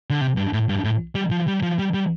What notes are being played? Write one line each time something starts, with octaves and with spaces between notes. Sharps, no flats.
D3
C3
G2
A2
G2
A2
G3
F3
G3
F3
G3
G3